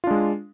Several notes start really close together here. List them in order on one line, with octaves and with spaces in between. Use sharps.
F4 D4 G#3